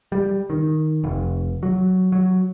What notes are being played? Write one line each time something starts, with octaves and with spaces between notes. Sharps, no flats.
G3
D#3
F1
F#3
F#3